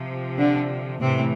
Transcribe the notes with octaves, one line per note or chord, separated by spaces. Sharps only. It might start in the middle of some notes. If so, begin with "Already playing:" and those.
Already playing: C3 F3
D3 D4
A2 C3 E3 C4